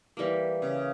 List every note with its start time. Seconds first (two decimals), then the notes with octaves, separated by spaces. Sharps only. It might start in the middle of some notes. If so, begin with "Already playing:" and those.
0.17 E3 G3 A#3
0.62 C#3